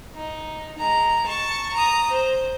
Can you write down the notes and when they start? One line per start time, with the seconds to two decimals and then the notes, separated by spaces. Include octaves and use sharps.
0.15 D#4
0.79 G#3 A#5
1.26 A5 C#6
1.73 A#5 D#6
2.11 C5